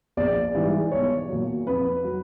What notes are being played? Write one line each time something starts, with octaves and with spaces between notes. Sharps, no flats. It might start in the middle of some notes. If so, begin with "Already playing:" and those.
A#1 D5
G#2 E3 G3
B1 C#5
A#2 F#3
F2 B4
F#3